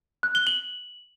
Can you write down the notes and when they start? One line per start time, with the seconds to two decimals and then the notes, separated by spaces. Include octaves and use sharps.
0.23 F#6
0.35 G7
0.47 F#7